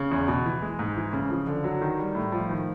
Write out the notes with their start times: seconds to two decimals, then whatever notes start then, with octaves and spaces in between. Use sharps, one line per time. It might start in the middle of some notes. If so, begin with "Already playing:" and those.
Already playing: C#3
0.11 E2
0.28 B2
0.46 E3
0.62 G#3
0.79 G#2
0.97 E3
1.13 C#3
1.30 F3
1.47 D3
1.64 F#3
1.81 D#3
1.99 G3
2.15 A2
2.32 F3
2.49 D#3